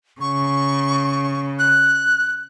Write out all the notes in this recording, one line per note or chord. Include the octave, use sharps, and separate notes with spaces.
C#3 C#6
F#6